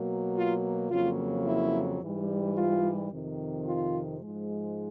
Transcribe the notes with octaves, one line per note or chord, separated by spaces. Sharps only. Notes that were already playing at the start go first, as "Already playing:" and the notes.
Already playing: B2 F#3 A#3
F4
F2 C#3 F#3 A#3 F4
E4
G#2 E3 G3
F4
F2 C3 D#3
F4
G#2 F3 G#3